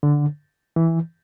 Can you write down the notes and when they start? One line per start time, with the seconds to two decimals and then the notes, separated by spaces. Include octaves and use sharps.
0.03 D3
0.76 E3